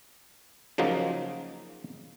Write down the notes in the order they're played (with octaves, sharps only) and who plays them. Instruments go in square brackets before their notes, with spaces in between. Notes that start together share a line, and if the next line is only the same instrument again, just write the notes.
[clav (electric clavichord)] C#3 F3 F#3 A#3 D#4